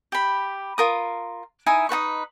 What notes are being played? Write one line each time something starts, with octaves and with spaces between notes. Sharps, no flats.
G4 B5
F4 A#4 D#6
D#4 E4 E5 G#5
D#4 F#4 B4 C#6